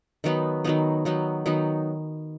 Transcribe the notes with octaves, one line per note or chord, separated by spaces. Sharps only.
D#3 F#3 B3 D#4
D#3 F#3 B3 D#4
D#3 F#3 B3 D#4
D#3 F#3 B3 D#4